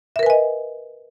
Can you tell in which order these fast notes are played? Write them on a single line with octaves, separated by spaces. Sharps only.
E5 A#4 B4 G#5 D#5